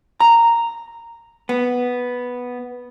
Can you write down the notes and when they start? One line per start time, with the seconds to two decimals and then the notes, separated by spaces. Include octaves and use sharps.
0.20 A#5
1.49 B3